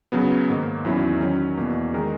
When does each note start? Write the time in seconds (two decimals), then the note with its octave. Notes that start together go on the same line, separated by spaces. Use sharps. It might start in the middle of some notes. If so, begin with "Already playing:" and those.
0.12 C#3 F#3 B3
0.49 G#2 D#3 A#3
0.85 E2 D#3 F#3 C#4 E4
1.21 D#3 F#3 C#4
1.57 E2 B2 A#3
1.94 D#3 G#3 D#4 A#4